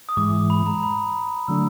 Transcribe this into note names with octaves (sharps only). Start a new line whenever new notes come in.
D#6
G#2 E3 G#3 D6
B5
A#5
B5
D3 F#3 A3 D4 E6